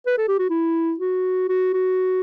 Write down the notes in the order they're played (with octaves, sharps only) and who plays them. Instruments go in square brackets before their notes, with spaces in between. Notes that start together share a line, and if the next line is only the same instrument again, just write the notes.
[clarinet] B4
A4
G4
F#4
E4
F#4
F#4
F#4